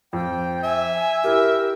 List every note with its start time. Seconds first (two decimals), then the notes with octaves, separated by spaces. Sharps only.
0.13 F2 G5
0.64 E5 G#5
1.24 E4 G4 A#4